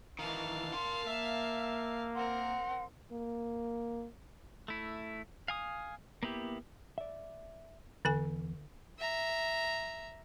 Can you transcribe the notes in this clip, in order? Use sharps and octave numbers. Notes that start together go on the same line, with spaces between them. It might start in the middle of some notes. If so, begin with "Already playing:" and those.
D#3 E3 F5 A5
A#4 C6
A#3 E5
C4 A#4 F#5 C6
A#3
A3 E4
F5 G#5 D#6
A#3 B3 E4 G4
D5 E5
E2 D3 A4 G#5
E5 A#5